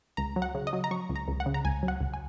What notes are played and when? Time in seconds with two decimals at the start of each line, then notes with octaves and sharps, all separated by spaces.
0.17 C#2 A#5
0.36 F#3
0.42 F#5
0.55 C#3
0.67 D#5
0.73 F#3
0.84 A#5
0.91 F#3 C#6
1.09 C#2
1.16 A#5
1.28 C#2
1.40 F#5
1.46 C#3
1.54 A#5
1.65 C#2 G#5
1.83 F#3
1.88 F#5
2.01 C#2
2.14 G#5